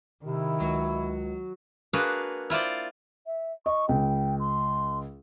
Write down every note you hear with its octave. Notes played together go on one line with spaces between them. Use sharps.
C3 D#3 E4
C#2 F#3
A#3 D4 F#4 G#4 B4 F5
E4 F4 C5 D5
E5
D#5 C#6
C#2 G5
C6